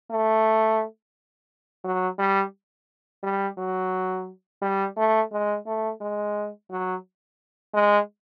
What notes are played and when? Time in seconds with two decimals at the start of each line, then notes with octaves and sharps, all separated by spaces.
0.10 A3
1.84 F#3
2.19 G3
3.23 G3
3.58 F#3
4.62 G3
4.97 A3
5.32 G#3
5.66 A3
6.01 G#3
6.70 F#3
7.74 G#3